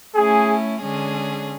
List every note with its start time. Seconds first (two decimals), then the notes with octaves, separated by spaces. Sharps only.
0.15 A3 C#4 E4 G#4
0.81 D3 G#3 C#4 G#4